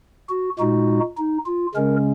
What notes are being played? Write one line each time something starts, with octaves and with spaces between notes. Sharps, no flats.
F#4
A#2 G#3 D#4 F#4
D#4
F4
C#3 G#3 C#4 A#4